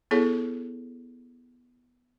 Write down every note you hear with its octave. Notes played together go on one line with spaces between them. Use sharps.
B3 E4 G#4 A4 C#5